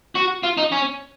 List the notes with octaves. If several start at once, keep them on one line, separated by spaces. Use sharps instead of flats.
F#4
F4
D#4
C#4